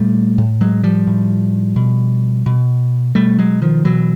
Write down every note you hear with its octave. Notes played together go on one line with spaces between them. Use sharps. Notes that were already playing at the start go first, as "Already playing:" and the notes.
Already playing: A#2 G3 A3
A2
F#3 G#3
F3 G3
A2
B2
B2
B2 G3 A3
F#3 G#3
D#3 F3
B2 E3 F#3